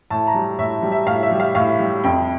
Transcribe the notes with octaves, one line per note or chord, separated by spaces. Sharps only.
A2 A5
A#5
G3
A2 E5
G3
E5
A2 F5
E5
G3
F5
A2 F5
G3
F2 G5